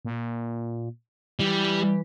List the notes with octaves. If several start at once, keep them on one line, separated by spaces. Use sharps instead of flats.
A#2
E3 G3